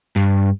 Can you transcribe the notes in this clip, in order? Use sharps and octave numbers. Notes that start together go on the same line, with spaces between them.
G2